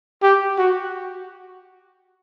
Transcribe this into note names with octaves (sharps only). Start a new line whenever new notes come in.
G4
F#4